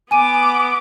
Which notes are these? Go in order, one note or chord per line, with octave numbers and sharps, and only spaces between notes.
B3 G#5 D6 D#7